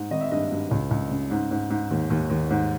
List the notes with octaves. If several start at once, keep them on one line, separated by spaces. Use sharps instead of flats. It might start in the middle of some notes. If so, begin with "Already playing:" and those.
Already playing: G#2
G#1 D#5
E5
G2 D#5
G2
C#2
C#2
C#3
G#2
G#2
G#2
D#2
D#2
D#2
G#2